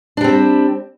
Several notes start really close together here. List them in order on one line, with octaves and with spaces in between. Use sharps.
D4 G3 C4